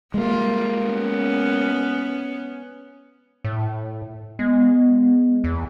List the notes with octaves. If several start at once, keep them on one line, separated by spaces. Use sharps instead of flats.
G3 G#3 A#3 F4
B3 C#4
A2
G#3 B3
E2